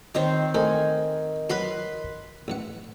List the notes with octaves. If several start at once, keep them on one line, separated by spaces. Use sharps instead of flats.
D#3 C4 C5 C#5 D#5
E3 A3 A#4 C5 D#5 G#5
F#3 F#4 B4 B5 C6
A1 E3 F#5